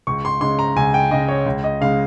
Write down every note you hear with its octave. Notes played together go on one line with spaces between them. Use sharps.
C#2 C#6
C6
C#3 G#3 C6
A#5
C#2 G#5
G5
C#3 G#3 D#5
C#5
C#2
D#5
C#3 G#3 F5